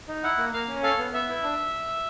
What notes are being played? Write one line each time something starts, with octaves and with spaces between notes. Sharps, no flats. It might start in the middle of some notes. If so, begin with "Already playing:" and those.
D#4
E4 F#5
A#3
A#3 F5
C#4
A4 F5
B3
B3 E5
E4
D4